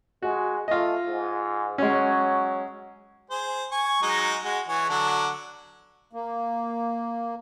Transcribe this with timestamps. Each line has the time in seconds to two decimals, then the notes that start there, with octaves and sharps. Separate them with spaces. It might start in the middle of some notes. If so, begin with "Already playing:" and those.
0.23 G#3 F#4
0.68 A3 F4 D#5
1.06 G#2
1.78 F#3 G#3 C#4
3.30 G#4 C5
3.71 G#5 C#6
4.02 F#3 G#3 D#4
4.44 G#3 F#4
4.68 E3 G#4 C#5
4.89 D3 F#3 D4
6.13 A#3